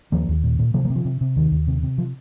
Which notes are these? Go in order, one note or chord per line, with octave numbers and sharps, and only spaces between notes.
D#2 F3 A#3
D#2
A#2
A#2
C3 F3 A#3
F3 A#3
C3
F3
C3
C3
D#2 D#3
D#2
C3
C3
F3